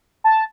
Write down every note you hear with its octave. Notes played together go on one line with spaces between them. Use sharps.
A5